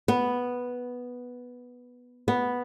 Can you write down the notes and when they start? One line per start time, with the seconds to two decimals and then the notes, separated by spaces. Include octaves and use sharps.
0.08 B3
2.28 B3